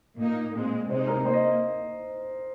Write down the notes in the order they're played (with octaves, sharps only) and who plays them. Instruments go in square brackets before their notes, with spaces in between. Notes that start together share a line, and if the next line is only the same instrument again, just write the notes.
[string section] A#2 A#3 D#4
A#2 G#3 C4
[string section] C3 [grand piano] C5
[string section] G#3 D#4
[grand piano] A#4
[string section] A#3 [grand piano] C5
[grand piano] D#5